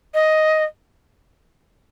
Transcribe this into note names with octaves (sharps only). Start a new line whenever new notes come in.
D#5